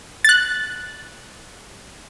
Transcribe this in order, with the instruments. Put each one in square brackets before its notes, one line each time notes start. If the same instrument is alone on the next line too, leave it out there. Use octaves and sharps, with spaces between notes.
[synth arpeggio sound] F#6 A6